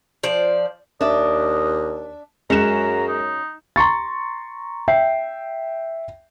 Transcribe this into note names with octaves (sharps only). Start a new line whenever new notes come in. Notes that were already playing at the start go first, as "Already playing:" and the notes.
F3 C5 D5
D#2 D4 D#5 E5
F#2 G#3 C#4 F#4 A#5 E7
D#4
A#5 C6 C#6 A6
E5 G5 C7